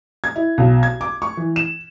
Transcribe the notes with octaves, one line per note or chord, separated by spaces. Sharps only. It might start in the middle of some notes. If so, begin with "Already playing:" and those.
G#6
E4
B1
G#6
D6
C#6
E3
E7